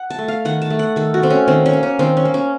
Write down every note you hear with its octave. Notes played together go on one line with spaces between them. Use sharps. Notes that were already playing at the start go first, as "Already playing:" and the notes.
Already playing: F#5
A5
A3
F5
D#3 F#5
A5
A3
F#5
D#3 A4
F#4
A3 C4
C#4
D#3 C4
C#4
A#3
C#4
D#3 C4
C#4
A#3
C#4